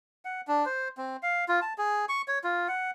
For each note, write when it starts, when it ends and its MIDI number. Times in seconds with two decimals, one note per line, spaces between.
0.25 0.41 78
0.48 0.65 62
0.66 0.88 72
0.97 1.17 60
1.23 1.44 77
1.48 1.60 65
1.62 1.73 81
1.78 2.05 68
2.09 2.22 85
2.28 2.39 73
2.44 2.67 65
2.68 2.91 78